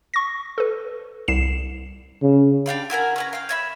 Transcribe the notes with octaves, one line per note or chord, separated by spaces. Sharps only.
C#6 A#6
A4 B4
C2 C7 E7
C#3
D4 G4 F5 B5
E4 F#4 A#4 G#5
C#4 B4 A#5
F5 G5
C#5 E5 B5